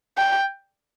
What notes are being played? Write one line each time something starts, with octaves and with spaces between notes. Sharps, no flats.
G5